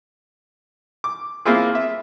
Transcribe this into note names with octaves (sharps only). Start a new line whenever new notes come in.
D6
A#3 C4 E4 F4 G#4
E5